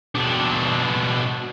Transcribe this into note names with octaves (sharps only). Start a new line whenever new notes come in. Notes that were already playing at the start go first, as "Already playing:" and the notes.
B2 D4